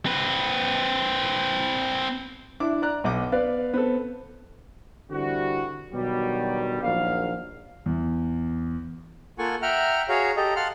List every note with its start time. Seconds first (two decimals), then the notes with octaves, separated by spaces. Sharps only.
0.06 C4 B4
2.60 D4 E4 D6
2.82 D5 A#5 F#6
3.04 B1 D#5 F#5 D6
3.32 B3 B4 D5 F5
3.74 B3 C4 A4
5.11 D3 E3 G3 C4 F#4
5.93 B2 D3 D#3 F#3 G3
6.83 A#1 D#2 F#3 F5
7.86 E2
9.39 A#3 F4 A4 F#5 G#5 C#6
9.62 E5 F#5 G5 A#5 F6
10.09 F#4 G#4 C#5 F5 A#5
10.37 G4 A4 D#5 A#5
10.56 F5 F#5 A5 C6 F6